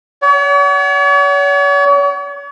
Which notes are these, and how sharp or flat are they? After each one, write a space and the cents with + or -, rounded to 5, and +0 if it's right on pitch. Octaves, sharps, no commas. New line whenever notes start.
C#5 +45 F#5 +25